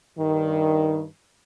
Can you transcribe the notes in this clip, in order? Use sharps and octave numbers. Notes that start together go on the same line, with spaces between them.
G2 D#3